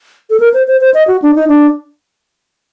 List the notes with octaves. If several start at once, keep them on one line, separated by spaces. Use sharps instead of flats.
A4
A#4
C5
C5
C5
D#5
F#4
D4
D#4
D4